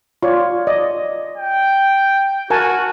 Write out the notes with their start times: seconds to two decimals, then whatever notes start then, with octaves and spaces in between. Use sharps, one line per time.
0.23 F4 C#5 D5
0.67 D5 D#5
1.37 G5
2.50 F#4 A#4 G#5 A5